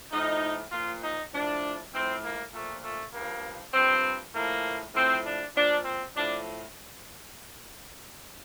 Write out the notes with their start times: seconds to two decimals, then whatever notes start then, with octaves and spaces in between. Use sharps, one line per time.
0.12 A2 F3 D#4
0.72 A#2 F3 F4
1.03 D#4
1.33 A2 F3 D4
1.93 A2 F3 C4
2.23 A#3
2.53 A#2 F3 A3
2.84 A3
3.13 G2 A#3
3.18 F3
3.74 G2 F3 C4
4.34 A2 F3 A#3
4.95 A2 F3 C4
5.25 D4
5.55 A#2 F3 D4
5.85 C4
6.15 A2 F3 D4